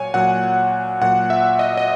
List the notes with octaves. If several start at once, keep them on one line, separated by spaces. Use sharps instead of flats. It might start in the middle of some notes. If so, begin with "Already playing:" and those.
Already playing: A#2 F#3 C#5 G#5
A#2 F#3 F#5
A#2 F#3 F#5
E5
D#5
D#5